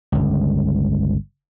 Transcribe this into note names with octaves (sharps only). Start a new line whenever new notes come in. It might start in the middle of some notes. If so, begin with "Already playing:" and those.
G1 C#2